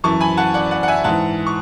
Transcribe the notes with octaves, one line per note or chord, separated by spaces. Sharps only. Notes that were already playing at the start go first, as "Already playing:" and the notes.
F#2 E3 A5 C#6
G#5 B5
F#5 A5
D5 F#5
D5 F#5
F#5
E5 G#5
G#2 E3 F#5 A5
C#6